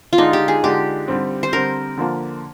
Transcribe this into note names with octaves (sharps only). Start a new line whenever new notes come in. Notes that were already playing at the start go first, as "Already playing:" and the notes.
F4
D3 G#3 D4 D#4
G4
G#4
D3 G#3 D4 G4
D3 G3 C4
C5
D3 G3 C4 A#4
D3 F3 A#3 F4